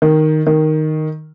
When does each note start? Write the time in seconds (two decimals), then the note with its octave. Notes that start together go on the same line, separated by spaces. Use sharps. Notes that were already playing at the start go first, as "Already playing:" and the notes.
0.02 D#3
0.47 D#3